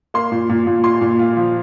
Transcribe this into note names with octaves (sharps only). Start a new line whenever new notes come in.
A#3 C6
A#2
A#2
A#2
F4 C6
A#2
F4
F3